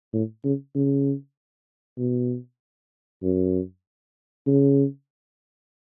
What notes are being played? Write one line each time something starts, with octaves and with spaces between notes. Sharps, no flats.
A2
C#3
C#3
B2
F#2
C#3